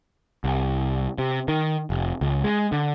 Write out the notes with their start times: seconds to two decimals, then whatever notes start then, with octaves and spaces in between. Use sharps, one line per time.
0.44 C2
1.18 C3
1.48 D#3
1.90 F1
2.21 C#2
2.44 G#3
2.72 D3